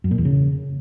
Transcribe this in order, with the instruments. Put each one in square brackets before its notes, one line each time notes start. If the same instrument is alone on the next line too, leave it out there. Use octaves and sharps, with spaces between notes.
[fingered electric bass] F#2
A#2
E2
C#3